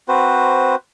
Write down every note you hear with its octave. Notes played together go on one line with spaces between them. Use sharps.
C4 F#4 B4 C5